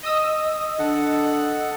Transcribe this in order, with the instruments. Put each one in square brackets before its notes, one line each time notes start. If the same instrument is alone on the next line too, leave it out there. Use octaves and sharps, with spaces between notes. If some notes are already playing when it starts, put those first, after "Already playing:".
[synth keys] D#5 D#6 E6
[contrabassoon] D3 [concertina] A4 F#5